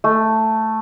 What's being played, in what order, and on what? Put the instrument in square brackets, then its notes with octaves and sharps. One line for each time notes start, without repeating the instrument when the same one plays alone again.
[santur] A3